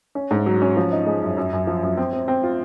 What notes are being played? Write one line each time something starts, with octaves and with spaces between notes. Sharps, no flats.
C#4
G#2
F#3
C#4
F3
D#4
G#3
F#2
F#2
F#2
F3
F#2
C4
C4
C4
F4